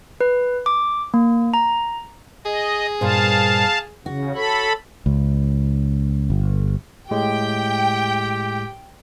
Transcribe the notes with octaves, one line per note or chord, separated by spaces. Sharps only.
B4
D6
A#3
A#5
G#4 D#5
G2 A#2 C5 F5 A5
C#3 F#4
A4 C#5 B5
C#2
G1
A2 G#3 G4 G5